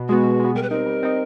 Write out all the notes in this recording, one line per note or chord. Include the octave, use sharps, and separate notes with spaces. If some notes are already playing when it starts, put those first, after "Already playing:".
Already playing: B2
G#3 B3 F#4
B2
G#3 B3
G3 A#4
B4
C4 D#4 A#4
G3
C4 D#4